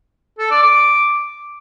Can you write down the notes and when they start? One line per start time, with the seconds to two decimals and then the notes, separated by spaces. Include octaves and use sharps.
0.39 A4
0.51 D5
0.62 D6